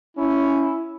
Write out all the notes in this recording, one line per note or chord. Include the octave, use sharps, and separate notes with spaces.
C#4 E4